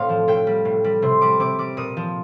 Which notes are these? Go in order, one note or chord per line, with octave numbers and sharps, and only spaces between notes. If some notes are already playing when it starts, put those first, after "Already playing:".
Already playing: A2 C3 A4 C5 D5 F5
F3
A2 G5
G3
A2
G3
C3 C6
G3 D6
C3 D6
G3 D6
A#2 D#6
F3